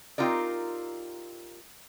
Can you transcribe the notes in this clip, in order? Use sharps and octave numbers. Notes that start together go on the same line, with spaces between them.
C4 D#4 F4 G4 A#4 D5